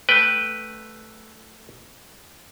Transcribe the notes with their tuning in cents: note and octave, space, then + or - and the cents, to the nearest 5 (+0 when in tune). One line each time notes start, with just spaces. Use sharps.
A3 +0 B4 +0 G5 +0